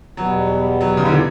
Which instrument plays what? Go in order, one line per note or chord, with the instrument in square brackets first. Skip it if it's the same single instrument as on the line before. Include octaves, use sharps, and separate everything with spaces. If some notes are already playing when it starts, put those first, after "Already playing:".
[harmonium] E2 B2 G3 B3 [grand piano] F#3
[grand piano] F#3
C#3
D3
E3